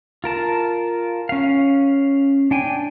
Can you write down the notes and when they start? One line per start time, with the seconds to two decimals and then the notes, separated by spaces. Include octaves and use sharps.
0.24 F4 A#4 A5
1.29 C#4 F5
2.51 D4 G5 G#5